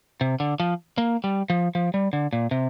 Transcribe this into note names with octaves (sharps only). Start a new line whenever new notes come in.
C3
D3
F3
A#3
G3
F3
F3
G3
D3
A#2
C3